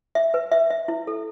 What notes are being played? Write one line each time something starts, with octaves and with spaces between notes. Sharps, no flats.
E5
B4
E5
E5
E4
A4